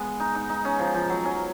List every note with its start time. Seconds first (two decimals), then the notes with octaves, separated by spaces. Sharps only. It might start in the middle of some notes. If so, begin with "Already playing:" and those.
Already playing: G#3 B3
0.20 D#4
0.35 D#4
0.49 D#4
0.65 C#4
0.79 F3
0.94 F3
1.10 F#3
1.25 C#4